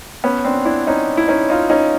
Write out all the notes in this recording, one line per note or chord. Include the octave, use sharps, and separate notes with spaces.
B3 C#4
C4 D4
D4 E4
C#4 D#4
E4
C#4 D#4
D#4 F4
C#4 D#4